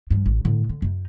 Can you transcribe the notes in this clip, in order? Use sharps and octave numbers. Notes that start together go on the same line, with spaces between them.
G2 F3
A1
A2 D3
D3
F#2 D#4